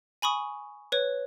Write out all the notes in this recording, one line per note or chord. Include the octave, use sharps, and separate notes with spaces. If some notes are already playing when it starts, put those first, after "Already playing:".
G#5 B5 C#6 D#6
B4 C#5